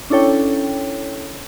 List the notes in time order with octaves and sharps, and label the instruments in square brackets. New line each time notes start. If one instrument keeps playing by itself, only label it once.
[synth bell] C#4 D4 E4 A4 C#5 G5